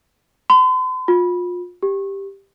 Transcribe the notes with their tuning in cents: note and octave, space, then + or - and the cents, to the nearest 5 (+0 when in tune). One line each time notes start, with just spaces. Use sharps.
C6 -45
F4 +30
G4 +5